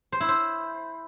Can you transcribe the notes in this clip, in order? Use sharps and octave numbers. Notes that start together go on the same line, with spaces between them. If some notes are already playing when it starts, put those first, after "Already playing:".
C5
E4
C5